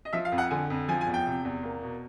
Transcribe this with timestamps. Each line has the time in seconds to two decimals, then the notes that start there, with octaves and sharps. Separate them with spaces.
0.05 D#5
0.13 F3 E5
0.25 F5
0.32 F2
0.38 F#5
0.51 D3 G#5
0.70 F2
0.88 F3 G#5
1.01 G#5
1.07 E2
1.14 G5
1.26 C3
1.45 E2
1.63 A#3
1.82 B2